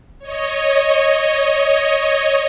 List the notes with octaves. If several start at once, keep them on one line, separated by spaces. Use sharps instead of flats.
C#5 D#5